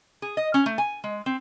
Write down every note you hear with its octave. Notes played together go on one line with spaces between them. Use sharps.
G#4
D#5
C#4
A3
G#5
G#3
C4